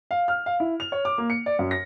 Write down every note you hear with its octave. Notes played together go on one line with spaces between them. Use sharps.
F5
F6
F5
E4
F7
C#5
D6
A#3
C#7
D5
F#2
A#6